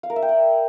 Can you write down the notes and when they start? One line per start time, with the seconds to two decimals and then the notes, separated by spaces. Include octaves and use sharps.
0.03 F5
0.10 A#4
0.16 E5
0.22 G5
0.29 D5